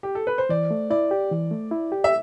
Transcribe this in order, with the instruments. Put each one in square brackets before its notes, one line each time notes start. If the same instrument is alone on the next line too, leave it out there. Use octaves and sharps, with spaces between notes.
[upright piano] G4
A4
B4
C5
[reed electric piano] E3 [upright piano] D5
[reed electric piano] A3
[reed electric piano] E4 [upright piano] D5
[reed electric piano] G4
E3
A3
E4
G4
[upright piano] E5